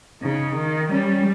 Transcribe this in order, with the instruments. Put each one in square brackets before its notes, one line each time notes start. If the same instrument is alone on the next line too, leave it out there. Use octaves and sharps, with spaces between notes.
[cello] C#3 [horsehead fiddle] D#4
[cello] D#3
[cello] G3 [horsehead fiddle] C#4